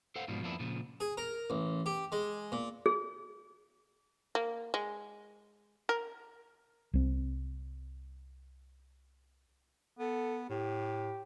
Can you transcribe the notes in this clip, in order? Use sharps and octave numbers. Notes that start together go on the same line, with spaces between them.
A4 C5 F5 F#5
G#2 B2 F3 G3
F2 F3 A#3 B3 D4 E4
A#2 C#3 F3
G#4
A#4
A1
G4
G#3
A#2
G#4
A#3
G#3
A#4
C2 C4
B3 A4
A2 G4